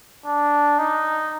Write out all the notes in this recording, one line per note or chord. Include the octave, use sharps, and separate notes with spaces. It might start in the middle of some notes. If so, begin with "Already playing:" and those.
D4
D#4